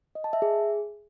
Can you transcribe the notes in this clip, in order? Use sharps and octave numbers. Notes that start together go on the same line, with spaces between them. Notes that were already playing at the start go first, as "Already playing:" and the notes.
D#5
A5
E5
G#4